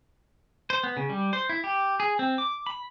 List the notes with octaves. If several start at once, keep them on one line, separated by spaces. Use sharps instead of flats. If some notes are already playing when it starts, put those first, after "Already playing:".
C5
B3
C#3
G3
C5
E4
G4
G#4
C4
D6
B5